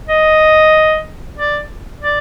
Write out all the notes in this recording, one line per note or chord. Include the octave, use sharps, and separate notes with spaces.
D#5
D5
D5